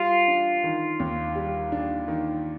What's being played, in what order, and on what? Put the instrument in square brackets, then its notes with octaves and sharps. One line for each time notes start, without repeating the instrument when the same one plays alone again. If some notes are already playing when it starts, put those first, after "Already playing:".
Already playing: [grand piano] G3 [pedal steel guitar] F4
[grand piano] D4
D#3
D#2
G3
D4
D#3